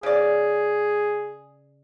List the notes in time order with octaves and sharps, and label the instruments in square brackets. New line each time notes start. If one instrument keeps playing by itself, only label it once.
[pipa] C#3 D5 [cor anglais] G#4